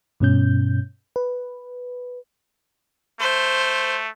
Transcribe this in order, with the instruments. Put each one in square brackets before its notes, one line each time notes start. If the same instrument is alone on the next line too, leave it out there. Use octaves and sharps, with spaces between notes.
[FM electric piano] G2 B2 C#4 G6
B4
[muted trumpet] A3 [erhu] C5